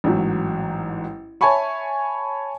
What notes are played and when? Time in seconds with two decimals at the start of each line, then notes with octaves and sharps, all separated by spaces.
0.04 A1 G#2 F#3
1.41 C#5 E5 G#5 A5 B5 C#6